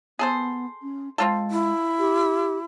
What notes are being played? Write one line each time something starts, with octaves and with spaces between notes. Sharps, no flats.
B3 G#4 A4 C5
C#4
G#3 C4 F4 A4
E4
G4